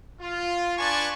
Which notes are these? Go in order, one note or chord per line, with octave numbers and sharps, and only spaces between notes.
F4
D4 B4 D5 G#5 A5 C#6